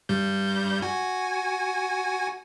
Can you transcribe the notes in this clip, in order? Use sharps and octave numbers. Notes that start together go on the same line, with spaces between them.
G2 G3 G6
F#4 G#5